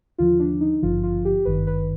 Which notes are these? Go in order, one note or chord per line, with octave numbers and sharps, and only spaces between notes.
D#2 D3 F3 F4
D4
D#4
G#1 G2 D3 F3 F4
F4
G4
G#1 G2 D#3 B4
B4